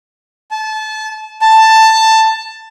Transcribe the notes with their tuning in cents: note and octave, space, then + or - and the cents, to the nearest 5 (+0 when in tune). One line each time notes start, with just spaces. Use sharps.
A5 -25
A5 +10